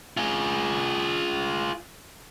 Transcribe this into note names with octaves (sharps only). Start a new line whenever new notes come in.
F4 G#4